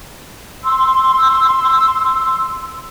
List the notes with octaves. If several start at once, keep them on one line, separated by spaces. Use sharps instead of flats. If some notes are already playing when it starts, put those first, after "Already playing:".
C6 E6